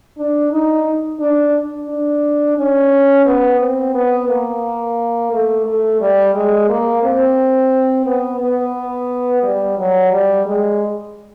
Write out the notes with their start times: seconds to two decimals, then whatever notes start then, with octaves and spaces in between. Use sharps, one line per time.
0.18 D4
0.52 D#4
1.20 D4
1.89 D4
2.57 C#4
3.26 B3
3.60 C4
3.94 B3
4.28 A#3
5.32 A3
5.66 A3
6.01 G3
6.35 G#3
6.69 A#3
7.03 C4
8.06 B3
8.40 B3
9.43 G3
9.78 F#3
10.12 G3
10.46 G#3